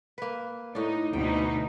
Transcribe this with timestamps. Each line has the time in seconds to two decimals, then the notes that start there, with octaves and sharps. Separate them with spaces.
0.18 A#3 B4
0.75 A2 D4 D#4
1.13 D2 B2 D#4 G5